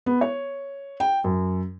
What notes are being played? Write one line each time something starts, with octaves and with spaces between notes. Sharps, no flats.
B3
C#5
G5
F#2